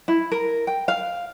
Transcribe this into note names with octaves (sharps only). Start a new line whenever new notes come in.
E4
A#4
G5
F5